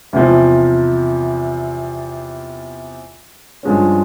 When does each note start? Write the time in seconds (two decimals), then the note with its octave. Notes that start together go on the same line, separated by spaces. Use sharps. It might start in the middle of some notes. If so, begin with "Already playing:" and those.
0.13 E2 C3 F3
3.63 G2 F3 G#3 C#4